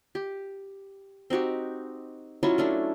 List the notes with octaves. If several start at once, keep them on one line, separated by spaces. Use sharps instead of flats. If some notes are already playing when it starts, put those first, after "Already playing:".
G4
C4 D#4 F#4 G4
F#3 C#4 E4 F4
A3 C#4 D4